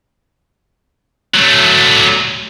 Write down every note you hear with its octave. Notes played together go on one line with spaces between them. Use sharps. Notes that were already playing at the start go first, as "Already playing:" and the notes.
F#3 A3